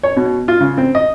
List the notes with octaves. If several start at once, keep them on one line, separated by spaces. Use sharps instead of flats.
C#5
B2
F4
C#3
C4
D#5